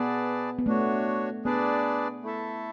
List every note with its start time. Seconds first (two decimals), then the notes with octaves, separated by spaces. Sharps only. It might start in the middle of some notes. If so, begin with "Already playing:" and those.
Already playing: B3 G#4 B4 D5 A5
0.59 B3
0.66 A3 D4 F#4 C#5
1.44 B3 D4 G#4 B4 D5 A5
2.23 A3 E4 A4 E5 A5